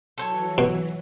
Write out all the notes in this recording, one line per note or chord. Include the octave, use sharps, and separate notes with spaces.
E3 F#3 A4 C5 C#5
B2